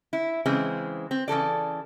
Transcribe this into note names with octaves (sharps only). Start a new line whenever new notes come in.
E4
C#3 E3 G#3 C4
C4
C#3 E3 A4 D5